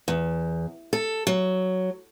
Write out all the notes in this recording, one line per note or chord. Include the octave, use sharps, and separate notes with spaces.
E2
A4
F#3